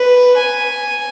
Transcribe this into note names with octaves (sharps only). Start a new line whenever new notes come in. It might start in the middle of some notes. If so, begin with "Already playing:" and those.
Already playing: B4
G#5